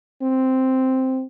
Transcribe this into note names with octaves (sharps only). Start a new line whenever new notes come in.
C4